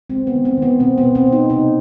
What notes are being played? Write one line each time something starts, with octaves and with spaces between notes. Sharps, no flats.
G#3 C4
B3
D#3
C4
D#3
B3
B2 C4
B3
B2
C4
B3
D#4
C3 D#4